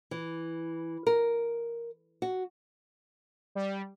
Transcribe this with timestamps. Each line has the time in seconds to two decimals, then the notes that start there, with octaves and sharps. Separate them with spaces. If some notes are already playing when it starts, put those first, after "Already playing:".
0.11 E3
1.07 A#4
2.22 F#4
3.55 G3